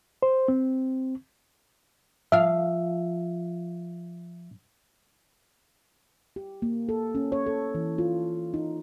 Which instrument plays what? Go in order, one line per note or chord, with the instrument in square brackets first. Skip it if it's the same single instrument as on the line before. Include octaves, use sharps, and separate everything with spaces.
[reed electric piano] C5
C4
[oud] F3 F5 [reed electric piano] E5
[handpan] G4
A#3
A4
C#4
C#5
A4
E3
F4
D#4